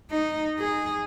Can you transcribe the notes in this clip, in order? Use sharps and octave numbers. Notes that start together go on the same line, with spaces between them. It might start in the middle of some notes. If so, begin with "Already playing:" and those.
D#4
G#4